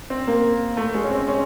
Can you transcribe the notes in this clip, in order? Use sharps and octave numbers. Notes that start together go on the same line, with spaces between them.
C4
A#3
A3
G#3
C#4
C4
C#4